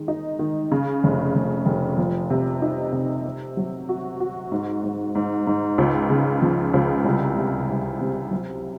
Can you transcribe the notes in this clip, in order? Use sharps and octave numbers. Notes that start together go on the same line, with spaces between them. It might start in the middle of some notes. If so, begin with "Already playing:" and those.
Already playing: D#3 G#3
D#4
D#3
C#3
F1
F1
F1
F3
C3
D#4
C3
C4
F#3
F#4
F#4
G#2
G#2
G#2
G#2
C#2
C#3
F3
C#2
C2
C3
C2
C3
F#3